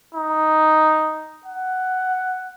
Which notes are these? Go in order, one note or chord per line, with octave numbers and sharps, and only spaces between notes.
D#4
F#5